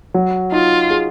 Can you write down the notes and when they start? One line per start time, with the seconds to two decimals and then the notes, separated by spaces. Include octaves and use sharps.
0.14 F#3
0.52 D#4 F4
0.91 G#4